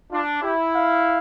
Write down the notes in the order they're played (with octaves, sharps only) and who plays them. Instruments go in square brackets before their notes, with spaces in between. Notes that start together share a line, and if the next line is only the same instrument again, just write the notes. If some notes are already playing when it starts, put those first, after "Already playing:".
[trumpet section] D4 [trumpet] F4
[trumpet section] E4 [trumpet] G4
[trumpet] F5